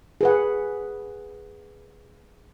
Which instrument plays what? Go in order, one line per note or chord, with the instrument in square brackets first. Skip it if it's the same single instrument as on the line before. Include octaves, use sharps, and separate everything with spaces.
[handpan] G#4 B4 F#5